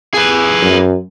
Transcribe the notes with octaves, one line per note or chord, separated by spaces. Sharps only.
G#4 B4
F#2